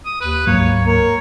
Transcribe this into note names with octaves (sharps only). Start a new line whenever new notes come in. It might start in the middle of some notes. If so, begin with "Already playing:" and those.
D#6
D#2 B4
D1 G#2 F#3 A#3 C#5
A#4 C#5